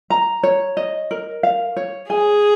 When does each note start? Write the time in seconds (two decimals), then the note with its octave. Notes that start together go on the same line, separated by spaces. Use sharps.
0.10 A#5
0.43 C#5
0.77 D#5
1.11 A#4
1.43 F5
1.77 C#5
2.09 G#4 G#5